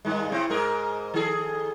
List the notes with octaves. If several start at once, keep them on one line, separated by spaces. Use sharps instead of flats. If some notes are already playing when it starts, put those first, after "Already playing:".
G2 D#3 G#3
C#3 C4 E4
G#2 G#4 A#4
D#3 G#4 A4